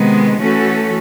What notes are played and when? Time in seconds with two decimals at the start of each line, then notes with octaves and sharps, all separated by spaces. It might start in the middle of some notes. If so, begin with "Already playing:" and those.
Already playing: C3 D#3 G#3 B3
0.39 E3 A3 C#4 F#4 A4